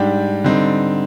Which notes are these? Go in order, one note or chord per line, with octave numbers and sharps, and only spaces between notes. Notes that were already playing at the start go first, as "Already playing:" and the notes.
Already playing: G#2 G3 D4 G4
D3 G3 C4 D#4